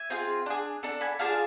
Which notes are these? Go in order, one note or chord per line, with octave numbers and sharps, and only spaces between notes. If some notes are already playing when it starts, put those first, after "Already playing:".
Already playing: E5 G#5
C4 F4 G#4
D4 G#4
D4 A4
G#5 B5
D4 F4 G#4 F5 A5